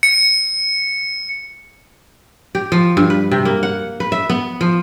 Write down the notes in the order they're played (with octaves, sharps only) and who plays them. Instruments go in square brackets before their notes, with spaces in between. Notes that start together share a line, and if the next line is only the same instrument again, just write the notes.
[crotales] C#7
[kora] G4
F3
G2
B4
C3
A#3
F#5
B4
E5
B3
F3